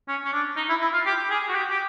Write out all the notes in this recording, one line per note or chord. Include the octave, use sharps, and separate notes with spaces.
C#4
C#4
D4
D#4
E4
E4
F4
G4
G#4
F#4
G4
G4